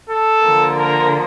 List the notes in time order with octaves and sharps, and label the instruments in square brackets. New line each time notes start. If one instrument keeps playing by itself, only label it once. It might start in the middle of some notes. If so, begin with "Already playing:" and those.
[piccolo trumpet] A4
[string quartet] D3 F3 A#3
[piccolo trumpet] A#4